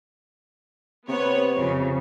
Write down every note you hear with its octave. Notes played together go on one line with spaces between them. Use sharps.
C3 B3 C#5
F2 C#3